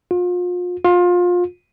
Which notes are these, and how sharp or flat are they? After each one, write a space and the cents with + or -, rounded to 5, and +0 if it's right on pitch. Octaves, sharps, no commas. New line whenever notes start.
F4 +35
F4 +25